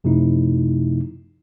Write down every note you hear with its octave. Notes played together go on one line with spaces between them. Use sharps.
F#2 C3 F3 A3 D#4 E4